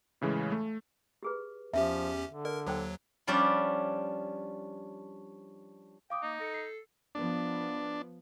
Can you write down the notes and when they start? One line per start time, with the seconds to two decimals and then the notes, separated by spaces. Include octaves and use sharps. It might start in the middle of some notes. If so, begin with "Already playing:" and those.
0.21 A2 C#3 E3 G#3
0.52 A3
1.23 G4 G#4 B4
1.73 E2 F3 C#4 G4 E5
2.28 D3
2.45 A#4 D5
2.67 D#2 F#3 A4 C5 G5
3.27 F3 G3 C#4 D4 E5
6.10 F5 G5 D6 D#6
6.23 A#3 D#4
6.40 A4 A#6 C#7
6.54 C7
7.15 F3 B3 D4